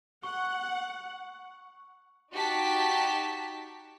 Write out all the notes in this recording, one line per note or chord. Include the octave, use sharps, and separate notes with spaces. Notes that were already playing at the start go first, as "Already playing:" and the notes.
F#5 C#6
D#4 F#4 G4 A5 B6